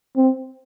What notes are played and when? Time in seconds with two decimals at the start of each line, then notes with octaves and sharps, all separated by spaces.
0.16 C4